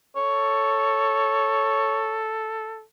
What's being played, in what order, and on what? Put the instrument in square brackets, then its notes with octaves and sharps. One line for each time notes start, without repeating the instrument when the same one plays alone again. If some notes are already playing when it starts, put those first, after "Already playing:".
[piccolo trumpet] A4 [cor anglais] C#5